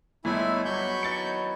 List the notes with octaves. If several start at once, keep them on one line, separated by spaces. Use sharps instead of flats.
G1 G#3 A3 B3 E4 C#5 G#5 B5
F#3 D4 B5 C#6 G6
D#3 E3 B3 A6 C#7